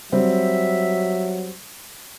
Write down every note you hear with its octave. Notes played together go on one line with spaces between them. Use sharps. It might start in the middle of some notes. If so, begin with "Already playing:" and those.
F#3 G3 C4 E5